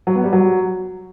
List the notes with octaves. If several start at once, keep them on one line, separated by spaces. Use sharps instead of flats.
F#3
B3
G3
F#3